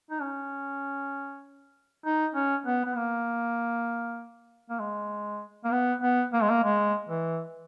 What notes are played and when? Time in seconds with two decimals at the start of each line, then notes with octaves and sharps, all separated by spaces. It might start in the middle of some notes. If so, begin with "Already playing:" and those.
0.11 D#4
0.21 C#4
2.05 D#4
2.34 C#4
2.66 B3
2.85 B3
2.96 A#3
4.70 A#3
4.79 G#3
5.64 A#3
5.72 B3
6.02 B3
6.33 A#3
6.42 G#3
6.49 A#3
6.63 G#3
7.09 E3